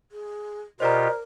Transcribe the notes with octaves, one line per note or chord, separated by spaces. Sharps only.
G#4
B2 F4 G4 A#4 C5 D5 D#5 A#5